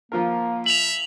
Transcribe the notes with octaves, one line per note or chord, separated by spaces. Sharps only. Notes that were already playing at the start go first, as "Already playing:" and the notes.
F3 A#3 F4 A#4
E5 F7 F#7